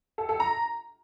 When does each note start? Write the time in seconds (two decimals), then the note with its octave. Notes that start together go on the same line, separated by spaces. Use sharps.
0.18 A4
0.29 A4
0.40 A#5